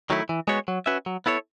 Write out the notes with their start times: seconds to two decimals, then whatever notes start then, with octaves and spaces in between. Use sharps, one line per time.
0.10 D#3 F#3 A3 E4
0.29 E3
0.48 G#3 B3 F#4 C#5
0.68 F#3
0.86 C#4 F#4 B4 E5
1.06 F#3
1.26 B3 E4 A4 C#5